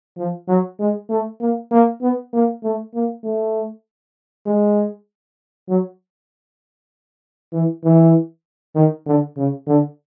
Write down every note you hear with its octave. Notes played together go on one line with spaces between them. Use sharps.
F3
F#3
G#3
A3
A#3
A#3
B3
A#3
A3
A#3
A3
G#3
F#3
E3
E3
D#3
D3
C#3
D3